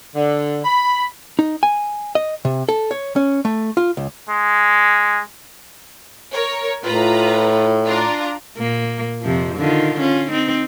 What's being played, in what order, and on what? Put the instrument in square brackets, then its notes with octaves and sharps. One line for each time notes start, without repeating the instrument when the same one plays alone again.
[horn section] D3
B5
[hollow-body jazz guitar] D#4
G#5
D#5
C3
A4
C#5
C#4
A3
F4
C#2
[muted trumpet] G#3
[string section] A#4 C#5
[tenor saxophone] A2 [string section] F4 B4 A#5
[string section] D4 F4 A#5
[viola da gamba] A#2 A#3
F2 C3 F3
D3 D#3 F4
C#4 F4
C4 D#4